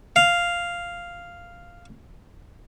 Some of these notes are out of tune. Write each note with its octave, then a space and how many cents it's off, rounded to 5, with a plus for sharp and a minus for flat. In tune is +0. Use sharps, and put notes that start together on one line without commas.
F5 -5